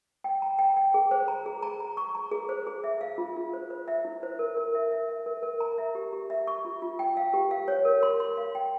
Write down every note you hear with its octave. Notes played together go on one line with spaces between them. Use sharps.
G5
A#5
G5
G5
G#4
C5
A#5
G#4
A#5
A#5
C#6
A#5
G#4
C5
G#4
E5
F5
F4
F4
C5
C5
E5
E4
C5
A#4
A#4
E5
E5
E5
A#4
A#4
A#5
E5
G4
G4
E5
C#6
F4
F4
G5
F5
G4
F5
C#5
A#4
C6
C6
F5
G5